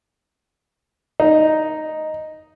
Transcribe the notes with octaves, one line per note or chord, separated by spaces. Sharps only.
D#4